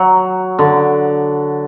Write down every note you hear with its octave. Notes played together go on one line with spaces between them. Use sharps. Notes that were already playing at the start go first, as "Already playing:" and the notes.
Already playing: F#3
D3